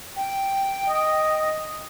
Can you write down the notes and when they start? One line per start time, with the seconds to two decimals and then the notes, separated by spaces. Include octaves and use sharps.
0.16 G5
0.89 D#5